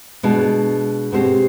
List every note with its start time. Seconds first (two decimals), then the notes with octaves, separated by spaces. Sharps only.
0.23 B2 G#3 D4
1.12 B2 G#3 C4 G4 C5